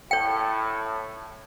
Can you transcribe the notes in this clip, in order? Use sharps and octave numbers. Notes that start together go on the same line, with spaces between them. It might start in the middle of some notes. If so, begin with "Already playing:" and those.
A2 C#5 G5